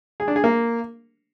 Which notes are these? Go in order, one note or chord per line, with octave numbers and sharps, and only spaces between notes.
G#4
D4
G#4
A#3